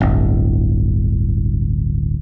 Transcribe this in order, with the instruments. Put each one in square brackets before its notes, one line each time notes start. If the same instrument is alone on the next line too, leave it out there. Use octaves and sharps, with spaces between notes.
[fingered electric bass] D1 G1